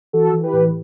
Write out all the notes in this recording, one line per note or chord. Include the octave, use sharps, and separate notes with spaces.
E3 F#4 A4
E3
G4 B4
A2